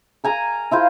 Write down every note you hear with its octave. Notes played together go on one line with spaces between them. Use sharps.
A#4 G#5 A#5
E4 F4 C5